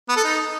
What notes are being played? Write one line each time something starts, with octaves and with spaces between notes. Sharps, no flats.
B3
A4
D#4